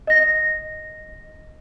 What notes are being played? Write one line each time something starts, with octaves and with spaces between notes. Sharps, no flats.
D#5 A#6